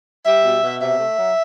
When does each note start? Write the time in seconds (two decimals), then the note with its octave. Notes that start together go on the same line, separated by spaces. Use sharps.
0.25 G3 E5
0.43 B2
0.62 B2
0.80 C3 E5
0.99 A3
1.17 F#3